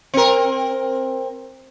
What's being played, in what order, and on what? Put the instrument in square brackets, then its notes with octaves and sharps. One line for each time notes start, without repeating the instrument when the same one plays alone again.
[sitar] C4 A#4